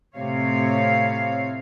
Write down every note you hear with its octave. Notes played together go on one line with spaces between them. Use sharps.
A2 C3 C4 C#5 F5